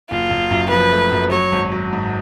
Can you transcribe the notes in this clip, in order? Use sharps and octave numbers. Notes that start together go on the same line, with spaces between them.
F#1 F4
F#1
F#2
F3 B4
A3
F#2
F#3 C#5
G#1
F#3
G#2